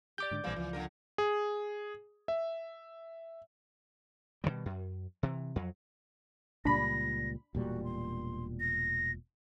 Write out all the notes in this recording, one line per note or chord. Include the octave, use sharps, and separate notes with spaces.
G4 D5 D6 G6
G#2 D3
A#1 E3 G3 A#3 C4
C#2 E3 F3
A#2 D3 A#4
G#4
E5
B2 D3 D#3 G3
F#2
C3 E3
F2 F#3
C#2 A#2 G3 D4 B5 A#6
E1 A#2 G3 F#4
C6
A#6